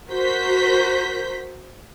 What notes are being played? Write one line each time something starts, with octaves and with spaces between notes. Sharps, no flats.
F#4 A#4 C5 G6 B6